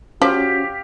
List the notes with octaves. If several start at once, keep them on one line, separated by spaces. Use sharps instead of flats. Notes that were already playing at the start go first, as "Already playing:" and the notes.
F3 C#4 F#4 G4 F5